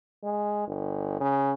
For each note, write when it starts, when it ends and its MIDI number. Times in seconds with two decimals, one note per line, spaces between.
0.23 0.64 56
0.67 1.17 31
1.20 1.52 49